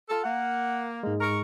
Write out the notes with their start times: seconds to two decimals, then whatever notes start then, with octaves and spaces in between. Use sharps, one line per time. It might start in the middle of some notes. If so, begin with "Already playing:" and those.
0.09 F4 A4
0.23 A#3 F#5
1.03 G#2 G#3 A#3
1.21 A#4 C#6